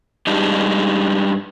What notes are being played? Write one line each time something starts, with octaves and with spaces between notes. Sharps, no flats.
G2 G3 G#3 D4 D#4